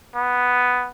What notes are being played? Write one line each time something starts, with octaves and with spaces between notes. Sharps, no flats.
B3